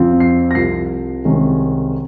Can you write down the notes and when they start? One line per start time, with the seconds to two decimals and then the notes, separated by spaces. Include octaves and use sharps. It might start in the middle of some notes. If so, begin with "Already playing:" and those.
Already playing: F2 C#3 F3 C4 F4
0.20 C7
0.51 A#6
0.55 C2 C3 F3 C7
1.25 C2 C3 D#3 G#3 C#4